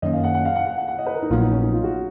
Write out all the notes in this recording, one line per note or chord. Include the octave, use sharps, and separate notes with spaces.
F#2 D#3 A#3 C#4 D#5
F5
F#5
F#5
F5
F#5
F#5
F#5
F#5
D#5
B4
A#4
D#4
A#1 A#2 F#3 B3 F4
D#4
C#4
D#4
F4
F#4